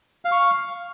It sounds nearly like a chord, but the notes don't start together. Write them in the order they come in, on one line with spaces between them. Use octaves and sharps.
F5 F6 C#6